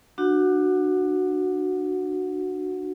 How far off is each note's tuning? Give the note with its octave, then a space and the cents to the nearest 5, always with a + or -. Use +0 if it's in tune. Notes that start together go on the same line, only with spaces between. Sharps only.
D4 +30 F#4 +0 F#5 -15